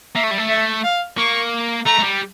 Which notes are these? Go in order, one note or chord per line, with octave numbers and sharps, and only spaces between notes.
A#3 E5
A3
G3
A3
E5
F5
A#3 C#6
A3 A#5
A3
G3